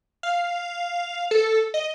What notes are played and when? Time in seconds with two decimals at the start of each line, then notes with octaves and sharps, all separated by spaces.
0.23 F5
1.31 A4
1.74 D#5